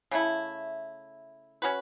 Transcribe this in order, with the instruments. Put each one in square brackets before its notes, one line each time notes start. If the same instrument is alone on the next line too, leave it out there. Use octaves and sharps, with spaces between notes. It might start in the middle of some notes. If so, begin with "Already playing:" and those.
[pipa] C#3 A3 E4
C#4 F#4 B4